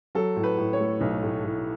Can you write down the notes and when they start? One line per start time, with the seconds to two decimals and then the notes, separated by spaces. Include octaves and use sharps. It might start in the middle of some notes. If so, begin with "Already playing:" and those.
0.15 F#3 A4
0.36 A2
0.44 B4
0.58 A2
0.73 C#5
0.80 A3
1.01 B1
1.23 A2
1.44 A2